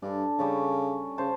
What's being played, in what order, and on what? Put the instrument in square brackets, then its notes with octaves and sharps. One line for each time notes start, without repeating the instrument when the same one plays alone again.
[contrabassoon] G2 [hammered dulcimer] D4 A4
[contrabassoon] C#3 [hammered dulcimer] G3 C#4 A4
[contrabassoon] C#3 [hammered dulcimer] C5 A5